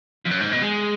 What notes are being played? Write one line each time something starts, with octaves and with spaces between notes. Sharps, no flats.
F2
F#2
G#2
B2
G#3